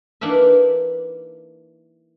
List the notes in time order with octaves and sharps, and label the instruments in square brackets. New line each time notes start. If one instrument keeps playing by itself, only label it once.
[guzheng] E3 A#3 D4 D#4 A#4 E5